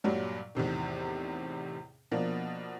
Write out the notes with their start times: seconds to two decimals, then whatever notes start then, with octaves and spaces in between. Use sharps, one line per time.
0.04 G2 A#2 F#3 G3
0.55 E2 A2 C3 D#3
2.11 B2 F3 A#3 D4